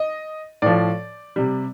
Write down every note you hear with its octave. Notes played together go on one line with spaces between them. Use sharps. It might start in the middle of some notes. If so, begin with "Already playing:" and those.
Already playing: D#5
A2 F3 D5
C3 G3